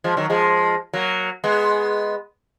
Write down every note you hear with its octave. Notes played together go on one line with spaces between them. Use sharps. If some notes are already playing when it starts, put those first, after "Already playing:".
F3 G#3
D#3 F#3
F3 G#3
F#3 A#3
G#3 B3